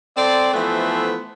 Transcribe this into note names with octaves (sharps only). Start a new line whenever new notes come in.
C4 A4 C5 D5
E3 F3 A3 B3 A4 C5